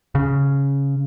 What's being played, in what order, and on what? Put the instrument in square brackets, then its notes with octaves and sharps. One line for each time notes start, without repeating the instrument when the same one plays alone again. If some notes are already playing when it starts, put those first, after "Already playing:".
[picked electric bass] C#3